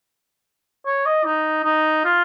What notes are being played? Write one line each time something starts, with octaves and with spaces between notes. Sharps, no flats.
C#5
D#5
D#4
D#4
F4